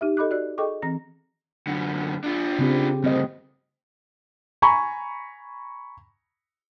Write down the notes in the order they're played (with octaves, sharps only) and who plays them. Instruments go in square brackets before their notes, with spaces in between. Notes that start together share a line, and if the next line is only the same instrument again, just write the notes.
[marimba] D#4 G4 E5
A4 D#5 B5 D6 F#6
F#4 D5 F#6
G#4 A4 D#5 G5 C#6 D6
E3 C4 A#5 A#6
[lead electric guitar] F#2 D3
D4 F4
[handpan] C#3 C4 G4
[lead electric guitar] D2 G2 [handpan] C4 D#5
[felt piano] G#5 A#5 B5 C#6